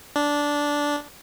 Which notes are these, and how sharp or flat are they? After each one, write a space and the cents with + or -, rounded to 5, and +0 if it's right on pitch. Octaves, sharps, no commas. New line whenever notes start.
D4 -10